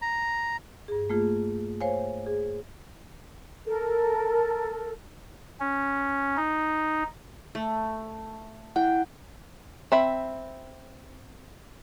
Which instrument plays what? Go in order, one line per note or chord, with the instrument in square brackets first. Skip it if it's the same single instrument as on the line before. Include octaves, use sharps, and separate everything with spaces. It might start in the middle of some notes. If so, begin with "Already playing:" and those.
[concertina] A#5
[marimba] G2 G#4
A3 A#3 F4 G#4
C5 C#5 F5 G#5
G#4
[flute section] A4 A#4
[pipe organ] C#4
D#4
[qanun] A3
[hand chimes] E4 F#5 [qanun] G5
[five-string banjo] C4 E5 B5